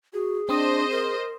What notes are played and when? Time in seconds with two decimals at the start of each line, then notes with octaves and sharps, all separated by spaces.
0.14 F#4 G#4
0.49 C4 D4 C5 D#5 C6 D#6
0.91 A#4